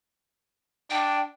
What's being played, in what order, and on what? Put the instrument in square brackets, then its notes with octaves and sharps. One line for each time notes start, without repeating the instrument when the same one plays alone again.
[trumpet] D4 [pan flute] G5